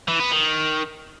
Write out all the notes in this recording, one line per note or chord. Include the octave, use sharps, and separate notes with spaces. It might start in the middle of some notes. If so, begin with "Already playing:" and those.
E3
B3
D#3